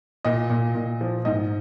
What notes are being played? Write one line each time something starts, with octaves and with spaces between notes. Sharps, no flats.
A#2 D#5
A#2
A#2
F3
G#2 D#5